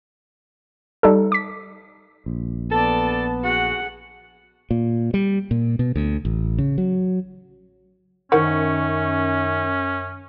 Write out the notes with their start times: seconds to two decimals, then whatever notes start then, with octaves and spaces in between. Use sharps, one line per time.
1.03 G3 D#4 A4
1.32 D6 B6
2.26 A#1
2.72 B3 A4 D5 A5
3.44 F#4 G#4 F#5
4.71 A#2
5.14 G3
5.51 A#2
5.79 B2
5.96 D2
6.25 A1
6.58 C#3
6.78 F#3
8.32 F#2 D#3 C#4 A#4 C5 F#5 C#6